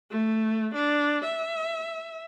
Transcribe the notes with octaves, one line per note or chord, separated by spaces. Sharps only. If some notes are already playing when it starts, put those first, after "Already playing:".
A3
D4
E5